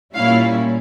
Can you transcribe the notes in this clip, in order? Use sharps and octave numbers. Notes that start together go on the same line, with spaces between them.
A#2 G3 A#3 C#4 E4 F5